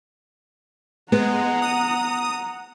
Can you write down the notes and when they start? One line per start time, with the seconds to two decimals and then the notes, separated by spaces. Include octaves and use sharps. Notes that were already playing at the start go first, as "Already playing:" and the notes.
1.12 G#3 B3 F#5 A#5
1.62 D#6